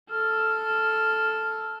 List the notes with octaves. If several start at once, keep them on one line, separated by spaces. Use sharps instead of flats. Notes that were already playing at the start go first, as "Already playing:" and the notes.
A4 F6